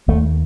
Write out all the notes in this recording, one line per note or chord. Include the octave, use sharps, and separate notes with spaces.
D#2 A3